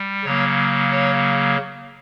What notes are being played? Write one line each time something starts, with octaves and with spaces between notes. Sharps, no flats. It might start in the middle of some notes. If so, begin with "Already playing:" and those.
Already playing: G3
C#3 F#3 A#3 C#5
C#5